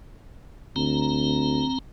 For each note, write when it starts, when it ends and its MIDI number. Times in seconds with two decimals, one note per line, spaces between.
0.76 1.65 38
0.76 1.79 60
0.76 1.79 82